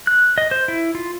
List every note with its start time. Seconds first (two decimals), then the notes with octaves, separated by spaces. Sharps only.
0.07 F#6
0.38 D#5
0.51 C5
0.68 E4
0.95 F4